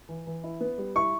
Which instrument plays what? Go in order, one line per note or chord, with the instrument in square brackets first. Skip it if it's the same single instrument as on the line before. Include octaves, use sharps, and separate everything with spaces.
[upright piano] E3
E3
E4
B3
G3
[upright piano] E4 [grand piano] C#6